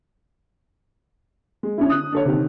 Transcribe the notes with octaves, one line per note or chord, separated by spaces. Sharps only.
G#3
C#4 D4 E4
D#6 F#6
D4 A4 C#5
C3 D#3